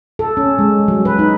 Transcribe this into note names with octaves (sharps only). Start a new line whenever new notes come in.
A4
C#4
G#3
F#3
B4
D#4